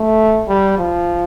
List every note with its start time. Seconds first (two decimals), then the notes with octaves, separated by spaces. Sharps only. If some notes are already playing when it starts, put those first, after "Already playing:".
Already playing: A3
0.48 G3
0.78 F3